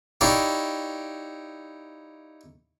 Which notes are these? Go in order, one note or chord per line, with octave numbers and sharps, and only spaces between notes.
D#4 E4 G4 C#5 D5 F5